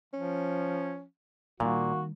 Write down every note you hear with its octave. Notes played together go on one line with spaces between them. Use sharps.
F3 C#4
A#2 D#3 G3 A#3 F#4